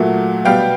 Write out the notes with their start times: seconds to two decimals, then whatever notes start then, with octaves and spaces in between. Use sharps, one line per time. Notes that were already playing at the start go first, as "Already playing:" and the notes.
Already playing: A#2 F#3 A3 F#5
0.45 B2 G3 B3 F5 G5